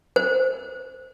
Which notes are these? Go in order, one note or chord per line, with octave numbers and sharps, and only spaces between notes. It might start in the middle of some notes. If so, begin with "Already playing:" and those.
C5